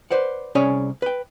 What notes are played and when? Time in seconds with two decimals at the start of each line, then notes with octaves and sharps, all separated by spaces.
0.11 B4 C5 D5 F#5
0.55 C2 C#4 G#4 C#5 D5 G#5
1.02 B4 G5